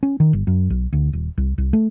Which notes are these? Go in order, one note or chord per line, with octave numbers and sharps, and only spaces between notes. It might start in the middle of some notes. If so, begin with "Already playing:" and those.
C#4
D#3
G1
F#2
B1
D2
D#1
C2
C2
A3